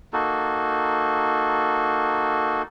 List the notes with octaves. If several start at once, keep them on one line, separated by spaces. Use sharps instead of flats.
A#3 D#4 F#4 A4